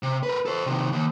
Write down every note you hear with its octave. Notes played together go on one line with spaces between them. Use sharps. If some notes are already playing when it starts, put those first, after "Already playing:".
C3
A#4 B4
A4 C5
C3 D#3
D#2